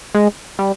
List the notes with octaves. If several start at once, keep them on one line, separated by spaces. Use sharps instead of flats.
G#3
G3